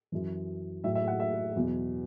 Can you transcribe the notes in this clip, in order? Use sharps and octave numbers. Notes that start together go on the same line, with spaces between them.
F#2 E3
A2 F#3 E5
E5
F#5
E5
E2 B2 F#3